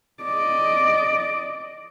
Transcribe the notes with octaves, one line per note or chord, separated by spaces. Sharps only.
D5 D#5